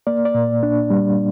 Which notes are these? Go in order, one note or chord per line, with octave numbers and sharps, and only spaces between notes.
A#3 D5
D5
A#2
D4
G3